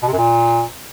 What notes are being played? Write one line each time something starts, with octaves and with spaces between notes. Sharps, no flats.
B2
C3
F#2
A#2